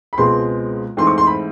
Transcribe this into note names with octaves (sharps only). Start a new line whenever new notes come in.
B5
C#2 B2 G#3 C4 C6
G#2 E3 A3 C4 C6
C#6
C6
B5